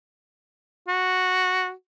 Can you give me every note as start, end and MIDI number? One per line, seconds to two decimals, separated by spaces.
0.88 1.71 66